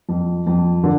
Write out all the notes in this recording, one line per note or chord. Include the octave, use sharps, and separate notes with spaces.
F2
F2
D3